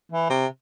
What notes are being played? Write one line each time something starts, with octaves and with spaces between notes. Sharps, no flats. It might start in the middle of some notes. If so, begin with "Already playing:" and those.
E3
C3